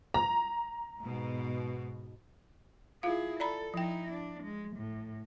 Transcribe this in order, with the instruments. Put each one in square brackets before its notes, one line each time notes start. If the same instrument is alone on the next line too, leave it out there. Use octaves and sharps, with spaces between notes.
[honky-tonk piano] A#5
[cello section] G#2 B2
[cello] E4 G#4 [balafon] F4 F5
[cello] A4 [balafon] D5 A#5 B5
[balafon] F3 G5 [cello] D#4 E4
[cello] D4
G#3
A2